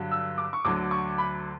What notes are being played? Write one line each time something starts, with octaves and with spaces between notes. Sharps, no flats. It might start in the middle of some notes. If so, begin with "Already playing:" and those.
Already playing: G2 D3 F#3
E6
D6
C#6
D2 D3 F#3 D6
C#6
B5